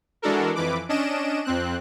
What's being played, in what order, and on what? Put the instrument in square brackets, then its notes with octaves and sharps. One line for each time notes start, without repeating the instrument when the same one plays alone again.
[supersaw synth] E3 G#3 D4 F#4 A4 A#4
F2 E3 B4 D6
C#4 D4 D#5 D7 E7
F2 C4 F#6